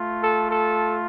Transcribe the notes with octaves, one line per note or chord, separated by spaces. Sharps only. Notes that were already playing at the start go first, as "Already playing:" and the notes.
Already playing: A3 F4
A4
A4